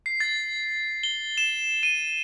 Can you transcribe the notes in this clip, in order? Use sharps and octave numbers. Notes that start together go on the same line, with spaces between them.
C7
A6
G7
E7
D#7